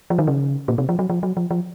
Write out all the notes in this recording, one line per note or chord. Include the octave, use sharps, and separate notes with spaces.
F3
D#3
C#3
A#2
C3
F3
F#3
F3
F#3
F3
F3